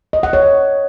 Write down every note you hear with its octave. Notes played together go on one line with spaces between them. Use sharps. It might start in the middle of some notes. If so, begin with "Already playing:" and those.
D#5
F#5
C#5